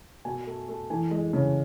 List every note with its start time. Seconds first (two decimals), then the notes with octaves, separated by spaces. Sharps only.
0.25 B2 G#5
0.47 A3
0.69 A3
0.90 E3 G#5
1.11 G#3
1.33 C#3